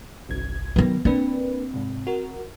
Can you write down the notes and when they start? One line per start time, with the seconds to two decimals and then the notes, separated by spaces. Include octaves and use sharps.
0.29 G1 C2 G#6
0.76 D#3 F#3 B3 B4
1.05 A#3 C4 D4 B4
1.74 G#2 C3
2.07 F#4 A#4